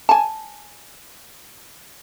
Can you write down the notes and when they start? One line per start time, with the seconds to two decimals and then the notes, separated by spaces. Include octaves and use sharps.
0.09 G#5 A5